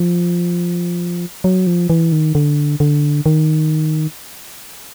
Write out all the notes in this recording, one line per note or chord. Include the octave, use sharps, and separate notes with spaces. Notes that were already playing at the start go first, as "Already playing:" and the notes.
Already playing: F3
F#3
F3
E3
D#3
D3
D3
D#3